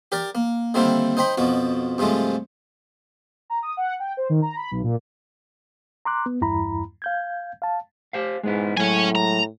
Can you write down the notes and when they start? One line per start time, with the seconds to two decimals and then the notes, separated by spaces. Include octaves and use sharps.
0.12 G4 A#4 D5
0.35 A#3
0.74 D3 D#3 G3 A#3 C4 E4
1.17 D#4 C5 G5 B5
1.37 F2 B2 F3 F#4
1.98 G2 C3 F3 G#3 A3
3.50 A#5
3.63 D#6
3.77 F#5
4.00 G5
4.17 C5
4.29 D#3
4.42 A#5
4.56 B5
4.71 B1
4.83 A#2
6.05 A#5 C6 D6 F#6
6.26 B3
6.41 E2 G2 E4 A#5 B5
7.02 F5 G6 G#6
7.62 F5 A5
8.13 G4 C5 F5
8.43 G#2 G#3 B3 E4
8.77 A2 F#3 G#3 C#5 G#5
9.15 A#5